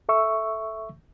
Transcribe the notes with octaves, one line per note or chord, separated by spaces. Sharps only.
A4 E5 C#6 E6